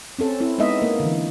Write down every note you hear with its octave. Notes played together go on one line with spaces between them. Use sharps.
C4 C#4 A4
C4 E4
G#3 B3 D#4 D#5 E5
A#3
D3 E3